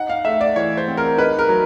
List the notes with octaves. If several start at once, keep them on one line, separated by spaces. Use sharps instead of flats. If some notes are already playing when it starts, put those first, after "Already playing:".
Already playing: D#4 F#5
F5
A3 E5
D5
E3 C#5
C5
C4
A#4
D#4 B4
A#4
F#3